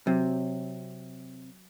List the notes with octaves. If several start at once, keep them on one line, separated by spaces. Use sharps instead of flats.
C3 F#3